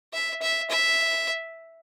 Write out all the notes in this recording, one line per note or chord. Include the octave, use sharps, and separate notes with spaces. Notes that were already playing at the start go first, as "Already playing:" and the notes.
E5
E5
E5